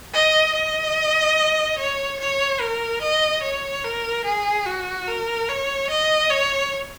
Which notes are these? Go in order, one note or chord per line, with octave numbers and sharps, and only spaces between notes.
D#5
D#5
C#5
C#5
A#4
D#5
C#5
A#4
G#4
F#4
A#4
C#5
D#5
C#5